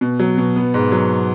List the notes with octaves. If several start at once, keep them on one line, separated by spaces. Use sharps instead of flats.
B2
F#3
B2
B3
G#2
F#3